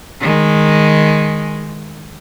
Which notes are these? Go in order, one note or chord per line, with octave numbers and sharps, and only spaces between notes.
D#3 G#3